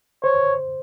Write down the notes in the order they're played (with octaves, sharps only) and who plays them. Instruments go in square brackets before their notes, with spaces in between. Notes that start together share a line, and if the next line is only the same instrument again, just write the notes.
[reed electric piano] C5 [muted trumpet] C#5